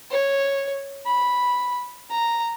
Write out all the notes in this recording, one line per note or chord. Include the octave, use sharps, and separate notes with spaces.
C#5
B5
A#5